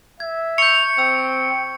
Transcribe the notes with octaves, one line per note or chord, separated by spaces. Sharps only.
E5 G#6
C#6 G6 C#7 F7
C4 G5 E6